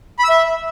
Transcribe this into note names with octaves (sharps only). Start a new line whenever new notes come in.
B5
E6
E5